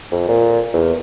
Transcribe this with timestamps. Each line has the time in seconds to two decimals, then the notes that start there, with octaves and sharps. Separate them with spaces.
0.11 F2
0.28 A#2
0.73 E2